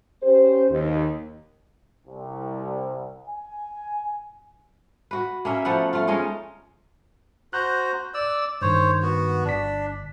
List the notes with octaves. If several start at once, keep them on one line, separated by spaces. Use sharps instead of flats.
C#4 G4 C5
D#2
C2
G#5
F#4 B4
A#3 C#4 E5
F3 A3 B3 F#5
A3 F4
G#3 C#4 D#4 F4
F#4 C5 A#5 F#6 G6
D5 E6
G2 D#3 C5 C#5
B3 F#4
G1 D4 B6